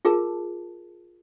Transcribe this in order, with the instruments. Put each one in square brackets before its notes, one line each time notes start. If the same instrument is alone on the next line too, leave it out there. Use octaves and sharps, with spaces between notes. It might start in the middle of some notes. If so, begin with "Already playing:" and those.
[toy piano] F4 G#4 A#4 A5